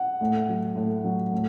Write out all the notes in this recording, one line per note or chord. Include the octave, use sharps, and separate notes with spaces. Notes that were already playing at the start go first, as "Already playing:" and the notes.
Already playing: F#5
A2
F#3
A2
F#3
A2